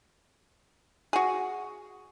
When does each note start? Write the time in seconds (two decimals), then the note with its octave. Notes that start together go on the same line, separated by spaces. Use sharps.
1.13 F#4 G#4